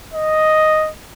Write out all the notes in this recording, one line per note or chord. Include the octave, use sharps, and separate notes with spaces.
D#5